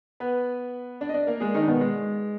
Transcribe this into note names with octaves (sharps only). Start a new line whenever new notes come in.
B3 B4
D4 D5
D#5
D4 D5
A#3 A#4
G#3 G#4
D#3 D#4
D4
B2 B3
G#3